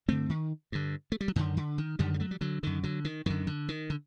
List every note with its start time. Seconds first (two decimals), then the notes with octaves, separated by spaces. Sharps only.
0.08 G2 D3 A3 C4
0.29 D#3
0.72 G2 D3
1.12 A3
1.21 G3
1.28 F#3
1.36 F#2 D3 D#3
1.57 D3
1.78 D#3
1.99 F#2 D3 D#3 G3
2.14 G3
2.20 F#3 A3
2.31 G3
2.41 D3 F#3
2.63 F#2 D3 D#3
2.83 D3 F#3
3.05 D#3
3.26 F#2 D3 D#3
3.47 D3
3.69 D#3
3.90 D3